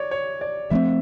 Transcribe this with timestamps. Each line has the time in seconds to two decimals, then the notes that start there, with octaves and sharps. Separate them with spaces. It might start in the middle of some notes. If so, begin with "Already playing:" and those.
Already playing: C#5 D5
0.11 C#5
0.41 D5
0.70 F3 A3 C4 E5